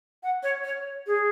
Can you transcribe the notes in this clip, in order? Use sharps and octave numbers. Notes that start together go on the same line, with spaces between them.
F#5
C#5
C#5
G#4